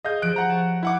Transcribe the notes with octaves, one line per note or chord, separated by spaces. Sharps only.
G#4 D#5 F5 G#5 G6
F3 G3 F#6 D7
F#5 A#5
C#5 A5
E4 F#5 D6